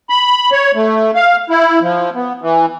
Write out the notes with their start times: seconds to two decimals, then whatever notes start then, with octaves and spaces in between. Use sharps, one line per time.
0.10 B5
0.52 C#5
0.75 A3
1.15 F5
1.50 E4
1.82 F3
2.16 B3
2.42 E3